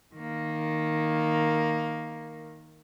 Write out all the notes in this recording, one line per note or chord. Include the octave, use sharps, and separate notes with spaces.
D#3 A#3